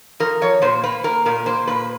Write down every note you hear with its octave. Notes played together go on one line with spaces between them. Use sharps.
F3 A#4
F3 C#5
A#2 C5
A#3 B4
A#3 A#4
A#2 A#4
A#3 C5
A#2 B4